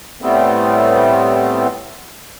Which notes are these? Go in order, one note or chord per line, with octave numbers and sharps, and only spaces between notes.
A2 G3 A3 B3 C4